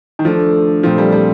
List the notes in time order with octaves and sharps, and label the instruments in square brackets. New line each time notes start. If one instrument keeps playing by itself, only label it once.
[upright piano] D#3
[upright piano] F3 [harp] A3 D4 A4
[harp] A#2 A3 C4 F4 A4 [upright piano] F3
[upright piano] G3
G3